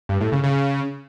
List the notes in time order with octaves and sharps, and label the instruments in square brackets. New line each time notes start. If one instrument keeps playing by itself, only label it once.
[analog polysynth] G2
A2
C#3
C#3